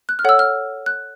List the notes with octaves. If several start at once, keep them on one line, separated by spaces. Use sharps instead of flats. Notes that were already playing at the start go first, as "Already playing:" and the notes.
F#6
F6
A4 C#5 F#5 E6
F6
F#6